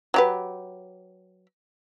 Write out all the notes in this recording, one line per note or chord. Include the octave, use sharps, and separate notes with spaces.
F#3 G4 B4